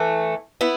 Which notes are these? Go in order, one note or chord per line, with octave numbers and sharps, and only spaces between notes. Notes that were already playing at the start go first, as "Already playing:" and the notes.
Already playing: E3 A3
B3 E4